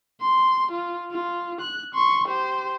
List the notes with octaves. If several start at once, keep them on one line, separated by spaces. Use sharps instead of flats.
C6
F4
F4
F#6
C6 C#6
G4 C5